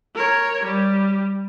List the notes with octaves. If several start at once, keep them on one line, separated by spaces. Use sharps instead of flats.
A#4 C#5
G3